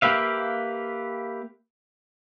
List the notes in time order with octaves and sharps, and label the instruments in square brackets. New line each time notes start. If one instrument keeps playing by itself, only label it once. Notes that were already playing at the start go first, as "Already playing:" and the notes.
[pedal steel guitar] A#3 G4 B4 E5 F5